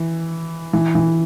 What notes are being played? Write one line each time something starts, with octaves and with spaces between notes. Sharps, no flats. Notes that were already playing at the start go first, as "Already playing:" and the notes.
Already playing: E3
E3
E3